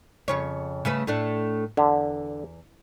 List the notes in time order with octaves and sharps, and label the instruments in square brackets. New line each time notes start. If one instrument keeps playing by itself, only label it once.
[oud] F2 C#3 C#5
C#3 A3 B4
A2 A3 D4
[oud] E2 [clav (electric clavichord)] D3